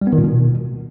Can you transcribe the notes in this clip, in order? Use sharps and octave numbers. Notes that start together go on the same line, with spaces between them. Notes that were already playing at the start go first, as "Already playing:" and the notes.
G3
B3
D#3
A#2
B2